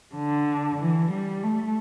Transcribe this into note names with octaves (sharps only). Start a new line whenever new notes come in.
D3
E3
G3
A3